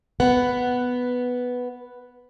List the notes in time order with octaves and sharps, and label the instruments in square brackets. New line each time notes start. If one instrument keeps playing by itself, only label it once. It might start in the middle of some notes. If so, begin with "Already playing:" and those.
[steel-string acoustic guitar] B3 F#5